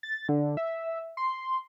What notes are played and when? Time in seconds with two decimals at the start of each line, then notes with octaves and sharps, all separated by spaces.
0.03 A6
0.29 D3
0.57 E5
1.17 C6